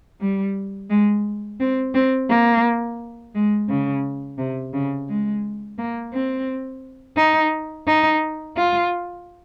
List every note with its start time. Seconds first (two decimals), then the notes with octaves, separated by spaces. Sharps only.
0.21 G3
0.90 G#3
1.60 C4
1.94 C4
2.30 A#3
3.35 G#3
3.69 C#3
4.38 C3
4.73 C#3
5.09 G#3
5.78 A#3
6.13 C4
7.17 D#4
7.87 D#4
8.57 F4